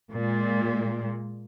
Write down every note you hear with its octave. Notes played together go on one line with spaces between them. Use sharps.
A#2 G#3